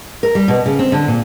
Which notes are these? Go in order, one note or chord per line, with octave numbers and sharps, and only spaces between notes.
A#4
G3
B2
C#3
C4
D3
A#2